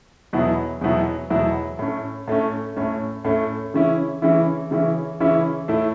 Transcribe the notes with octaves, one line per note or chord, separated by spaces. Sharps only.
E2 B2 F#3 B3 E4
E2 B2 F#3 B3 E4
E2 B2 F#3 B3 E4
A2 A3 C#4
A2 A3 C#4
A2 A3 C#4
A2 A3 C#4
C#3 E3 C#4 E4
C#3 E3 C#4 E4
C#3 E3 C#4 E4
C#3 E3 C#4 E4
A2 A3 E4